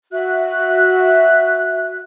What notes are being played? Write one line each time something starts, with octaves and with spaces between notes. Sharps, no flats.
F#4 E5 F#6